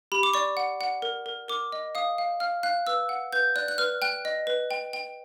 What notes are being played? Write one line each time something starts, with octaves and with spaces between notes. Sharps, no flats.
G4 B5
D6
D5 C#6
F#5
F#5
A#4
A#4
A#4 D6
D#5
F5 D#6
F5
F5 F6
F5 F#6
B4 E6
F#5
B4 G6
D5 F#6
F#6
B4 F6
G5 F#6
D#5
B4
G5
G5